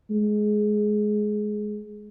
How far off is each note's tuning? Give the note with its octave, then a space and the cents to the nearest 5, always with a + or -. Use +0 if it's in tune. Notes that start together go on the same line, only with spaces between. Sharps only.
G#3 +15